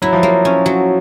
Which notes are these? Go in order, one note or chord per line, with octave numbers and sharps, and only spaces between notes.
F#3 E4
F3
F#3 A#3
C#4
F#3